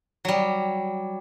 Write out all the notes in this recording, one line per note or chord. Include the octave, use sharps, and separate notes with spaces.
F#3 G3